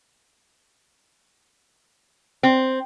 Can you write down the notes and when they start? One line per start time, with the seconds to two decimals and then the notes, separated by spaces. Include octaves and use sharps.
2.43 C4